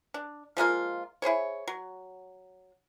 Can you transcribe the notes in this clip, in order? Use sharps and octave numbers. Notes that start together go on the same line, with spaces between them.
D4
F3 G#3 A#3 F4
E4 G#4 C5 C#5
F#3